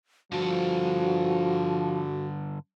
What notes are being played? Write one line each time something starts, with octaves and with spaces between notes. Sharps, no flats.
G2 D3 F3 F#4